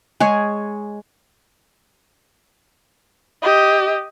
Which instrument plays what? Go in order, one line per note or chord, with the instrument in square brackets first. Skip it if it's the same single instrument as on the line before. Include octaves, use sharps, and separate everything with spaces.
[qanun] G#3 G#4 C#5
[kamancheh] G4 D#5